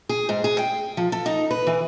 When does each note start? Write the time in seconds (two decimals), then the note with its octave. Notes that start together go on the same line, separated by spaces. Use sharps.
0.09 G#4
0.29 G#2
0.44 G#4
0.58 G5
0.97 F3
1.12 A4
1.26 D#4
1.51 B4
1.67 E3